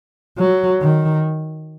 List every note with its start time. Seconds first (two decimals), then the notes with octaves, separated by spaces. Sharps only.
0.38 F#3
0.82 D#3